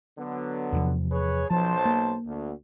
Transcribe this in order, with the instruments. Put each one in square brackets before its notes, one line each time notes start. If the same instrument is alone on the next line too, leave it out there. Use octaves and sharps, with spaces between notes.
[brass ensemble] D3 F#3 B3
[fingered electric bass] E2 C3 F3
[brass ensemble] G#4 B4 C#5
[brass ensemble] B1 C5 A5 [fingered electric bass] F3
[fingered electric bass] A#3
[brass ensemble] D2